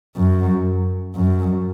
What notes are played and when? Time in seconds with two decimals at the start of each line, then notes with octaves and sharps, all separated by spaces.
0.17 F#2
1.16 F#2